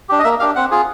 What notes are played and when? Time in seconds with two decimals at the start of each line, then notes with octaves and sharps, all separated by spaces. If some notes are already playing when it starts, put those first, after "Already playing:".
0.09 D4 G4
0.19 D#5
0.24 A#3 E5
0.40 D4 G4 F5
0.55 C4 F#5
0.71 F4 G#4